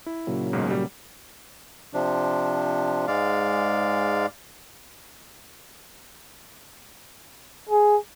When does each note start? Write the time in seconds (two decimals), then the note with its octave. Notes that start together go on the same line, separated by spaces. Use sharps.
0.06 E4
0.27 A#2 C#3 F#3
0.53 B1 G#2
0.71 G3
1.93 C3 F3 D4
3.08 G#2 G#3 D5 F5
7.69 G#4